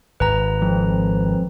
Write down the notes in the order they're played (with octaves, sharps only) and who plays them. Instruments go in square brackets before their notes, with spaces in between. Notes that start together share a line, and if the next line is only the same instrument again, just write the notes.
[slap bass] G#1 [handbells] B4 A#5
[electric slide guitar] F2